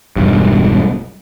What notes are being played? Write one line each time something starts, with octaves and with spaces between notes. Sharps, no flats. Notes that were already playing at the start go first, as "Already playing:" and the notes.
E1 B1 G2